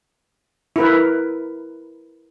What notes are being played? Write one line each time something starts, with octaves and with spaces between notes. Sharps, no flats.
E4 A#4 B4